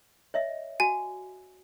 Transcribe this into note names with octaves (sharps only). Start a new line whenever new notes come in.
C#5 D#5 E5
F#4 G#5